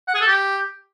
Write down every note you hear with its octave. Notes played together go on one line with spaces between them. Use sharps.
F#5
G#4
A4
G4